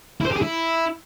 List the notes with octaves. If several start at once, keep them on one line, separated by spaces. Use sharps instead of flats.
E4
C5
G4
G#4
E4